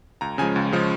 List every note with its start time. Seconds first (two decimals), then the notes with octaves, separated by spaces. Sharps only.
0.21 C#2 A#5
0.38 C#3 F3 G#3 G#5
0.56 C#2
0.73 C#3 F3 G#3